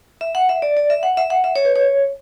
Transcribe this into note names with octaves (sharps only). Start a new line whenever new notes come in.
E5
F#5
E5
D5
D5
E5
F#5
E5
F#5
E5
C#5
B4
C#5